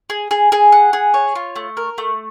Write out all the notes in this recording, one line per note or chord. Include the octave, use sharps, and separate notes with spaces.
G#4
G#4
G#4
F#5
G#4
C#5
F4
A3
A#4
A3